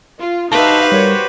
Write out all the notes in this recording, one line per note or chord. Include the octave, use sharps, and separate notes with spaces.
F4
D#4 F#4 G4 B4 C5 E5 F5 A5
G3 A#4 C#5